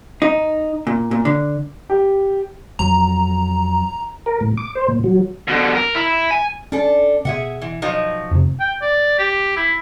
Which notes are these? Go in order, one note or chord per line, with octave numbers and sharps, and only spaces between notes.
D#4
A#2
A#2
D3
G4
F2 F#3 A#5
A#4
A2
D6
C5
A#2
F#3
B2 D3
A#4
E4
G#5
C#4 D4 A4
B2 G#4 E5 F#5
E3
F3 F#3 D#4
F2 C3
G5
D5
G4
E4